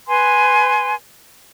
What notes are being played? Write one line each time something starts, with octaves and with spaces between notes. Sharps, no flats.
B4 G#5 C6